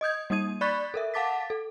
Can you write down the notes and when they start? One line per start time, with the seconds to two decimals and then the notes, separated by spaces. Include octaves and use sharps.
0.01 D#5 D#6 G6 G#6
0.30 G3 A#3 D#4 D#6 G#6 D#7
0.61 D5 B5 C#6 F#6 A6 B6
0.94 A4 A#4 E5
1.14 F5 F#5 A5 D6 A6 B6
1.50 A4